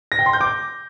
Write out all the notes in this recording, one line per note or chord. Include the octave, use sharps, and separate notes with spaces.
A#6
G5
C6
G6
D6